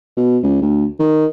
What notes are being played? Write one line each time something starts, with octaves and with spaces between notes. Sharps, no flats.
B2
C#2
D2
D#3